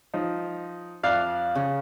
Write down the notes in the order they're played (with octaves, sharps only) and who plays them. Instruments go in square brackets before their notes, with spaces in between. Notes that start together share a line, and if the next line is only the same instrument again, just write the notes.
[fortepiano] F3 D#4
[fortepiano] F2 D5 F#6 [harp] F5
[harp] C#3